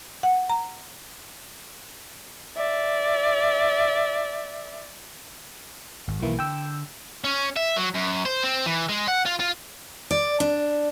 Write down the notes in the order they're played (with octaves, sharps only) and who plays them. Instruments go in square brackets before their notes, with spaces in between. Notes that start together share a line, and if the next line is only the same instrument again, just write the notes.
[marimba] F#5
A#5
[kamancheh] D5 E5
[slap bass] G#1
[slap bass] B1 D#3 [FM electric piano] E3 A#3 E4
[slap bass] D3 [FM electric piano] G5 E6
[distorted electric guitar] C#4
E5
F#3
F#2
C5
C4
E3
G#3
F#5
F4
F4
[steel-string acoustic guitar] D5
D4